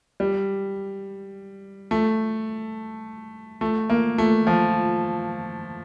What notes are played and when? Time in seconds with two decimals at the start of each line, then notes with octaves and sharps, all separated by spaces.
0.20 G3
1.91 A3
3.61 A3
3.90 A#3
4.18 A3
4.47 F3